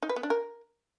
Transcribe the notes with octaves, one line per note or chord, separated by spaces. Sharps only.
D#4
B4
B3
D4
A#4